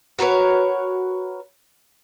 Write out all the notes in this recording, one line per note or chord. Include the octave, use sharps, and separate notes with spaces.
F#4 A#4 B4 C#5